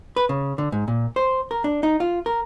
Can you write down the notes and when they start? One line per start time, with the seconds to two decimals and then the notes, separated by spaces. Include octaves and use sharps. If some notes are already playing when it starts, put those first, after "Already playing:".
0.16 B4
0.29 C#3
0.58 D3
0.72 G#2
0.88 A#2
1.16 C5
1.51 A#4
1.64 D4
1.83 D#4
2.00 F4
2.26 A#4